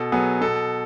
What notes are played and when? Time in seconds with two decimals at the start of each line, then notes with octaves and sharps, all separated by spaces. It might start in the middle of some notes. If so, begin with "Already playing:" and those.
Already playing: B2 A4
0.12 F#3 B3 G#4
0.41 B2 A4